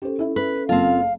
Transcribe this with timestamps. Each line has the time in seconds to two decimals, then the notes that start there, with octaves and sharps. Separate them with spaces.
0.02 C#4 G4 A4 C5
0.19 E4 E5
0.36 B4
0.69 F#1 A#3 C4 F4 F5 A5